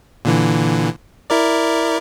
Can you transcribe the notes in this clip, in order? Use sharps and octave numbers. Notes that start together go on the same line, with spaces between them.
A#2 D3 E3
E4 A#4 D5